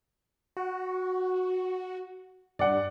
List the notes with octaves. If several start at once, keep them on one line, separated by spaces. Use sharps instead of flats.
F#4
G2 D5 F#5